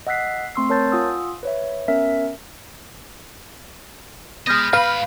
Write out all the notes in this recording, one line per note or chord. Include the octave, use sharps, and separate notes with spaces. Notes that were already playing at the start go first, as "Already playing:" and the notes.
D#5 F#5 E6 F#6 B6 C7
A3 C4 C6 C#6 E6 C7
A#4 C#5 A5 G6 A6
F4 F#5 G#5 D#6 E6
B4 C#5 E5
B3 C#4 A#4 E5
G#3 B3 B4 D#5 F6 G6 A#6
G#2 B4 F5 B5